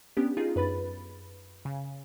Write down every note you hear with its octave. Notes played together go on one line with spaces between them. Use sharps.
B3 C#4 D4 G4
D#4 F4 G#4
F#2 B4 B5 A6
C#3